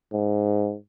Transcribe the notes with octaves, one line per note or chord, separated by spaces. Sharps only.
G#2